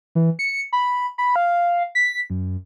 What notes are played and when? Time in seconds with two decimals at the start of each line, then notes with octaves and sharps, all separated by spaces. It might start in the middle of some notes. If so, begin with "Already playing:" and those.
0.15 E3
0.39 C#7
0.73 B5
1.18 B5
1.36 F5
1.95 B6
2.30 F#2